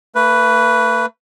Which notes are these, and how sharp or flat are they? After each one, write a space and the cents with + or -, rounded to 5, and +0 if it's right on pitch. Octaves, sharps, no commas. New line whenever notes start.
A3 +45 B4 +0